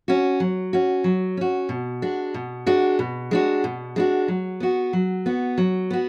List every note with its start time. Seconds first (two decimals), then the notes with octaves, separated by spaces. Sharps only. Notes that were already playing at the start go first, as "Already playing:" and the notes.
0.08 C#4 F#4
0.40 F#3
0.73 C#4 F#4
1.04 F#3
1.37 C#4 F#4
1.69 B2
2.02 G#3 D4 F#4
2.34 B2
2.66 G#3 D4 F#4
2.99 B2
3.31 G#3 D4 F#4
3.64 B2
3.96 G#3 D4 F#4
4.28 F#3
4.60 B3 F#4
4.93 F#3
5.26 B3 F#4
5.58 F#3
5.91 B3 F#4